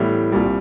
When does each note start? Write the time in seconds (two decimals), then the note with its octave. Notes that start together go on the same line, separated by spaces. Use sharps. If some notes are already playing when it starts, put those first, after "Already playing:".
Already playing: A2 E3 G3 B3
0.32 C2 A#2 G3